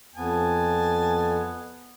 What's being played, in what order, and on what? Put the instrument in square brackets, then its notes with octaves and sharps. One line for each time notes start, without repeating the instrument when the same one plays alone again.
[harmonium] F2 [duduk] B3 [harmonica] G#5 A5